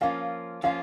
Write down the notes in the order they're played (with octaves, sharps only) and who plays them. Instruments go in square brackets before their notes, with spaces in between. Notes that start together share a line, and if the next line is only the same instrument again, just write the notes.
[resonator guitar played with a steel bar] F3 A#3 C#4 F4 [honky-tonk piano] F5
[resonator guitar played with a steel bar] F3 A#3 C#4 F4 [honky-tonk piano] F5